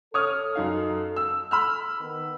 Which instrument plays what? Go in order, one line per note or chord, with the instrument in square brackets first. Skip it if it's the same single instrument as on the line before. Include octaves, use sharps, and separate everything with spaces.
[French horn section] A4 [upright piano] C#5 D#6 F6
[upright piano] F#2 D#4 F5
E6
B5 E6 F6
[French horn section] D#3 B3